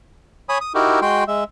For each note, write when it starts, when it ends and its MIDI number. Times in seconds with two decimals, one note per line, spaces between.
0.49 0.58 73
0.49 0.58 80
0.49 0.58 83
0.49 0.58 87
0.61 0.73 87
0.75 1.00 63
0.75 1.00 64
0.75 1.00 66
0.75 1.00 67
0.75 1.00 70
1.02 1.24 56
1.02 1.24 66
1.02 1.24 79
1.02 1.24 84
1.27 1.44 56
1.27 1.44 76